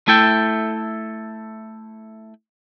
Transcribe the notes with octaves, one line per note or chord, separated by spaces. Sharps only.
A3 E4 A4 G5